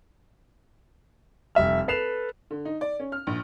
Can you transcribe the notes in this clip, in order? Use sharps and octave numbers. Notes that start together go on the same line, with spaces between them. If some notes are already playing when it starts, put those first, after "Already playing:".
F1 G3 E5 F6
A4 B4 C7 E7 F7
D3
D#4
D5
C#4
F6
A#1